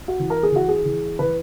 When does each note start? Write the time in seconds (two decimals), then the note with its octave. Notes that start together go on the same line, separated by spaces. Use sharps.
0.08 F#4
0.20 E3
0.30 A#4
0.43 G#4
0.52 E3 F#4
0.68 G#4
0.85 E3
1.19 E3 B4